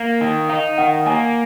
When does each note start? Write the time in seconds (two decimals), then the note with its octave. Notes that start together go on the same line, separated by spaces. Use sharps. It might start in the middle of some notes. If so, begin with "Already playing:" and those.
Already playing: A#3 F5
0.21 D#3
0.49 D#4 F5
0.78 D#3 F#5
1.06 A#3 G#5